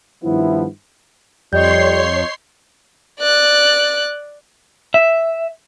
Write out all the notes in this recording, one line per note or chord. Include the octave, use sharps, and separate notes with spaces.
G2 D#3 F3 B3 E4
F2 G3 C#5 D#5 C6 G6 C7
D5 F#6
E5